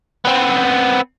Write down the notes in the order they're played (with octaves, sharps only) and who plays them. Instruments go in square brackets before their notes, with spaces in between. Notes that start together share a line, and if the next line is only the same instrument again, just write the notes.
[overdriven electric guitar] B3 C4